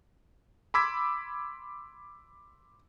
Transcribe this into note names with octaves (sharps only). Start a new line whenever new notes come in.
B5 C6 D6 E6 G#6 B6